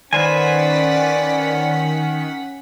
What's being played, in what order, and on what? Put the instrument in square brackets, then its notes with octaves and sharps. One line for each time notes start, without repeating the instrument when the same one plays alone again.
[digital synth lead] D#3 [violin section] C#4 F#5 B6 [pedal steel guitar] B4 C5 G#5 [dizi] D5